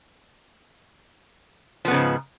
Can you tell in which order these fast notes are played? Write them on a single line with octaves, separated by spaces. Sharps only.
F3 B3 C#3 G#2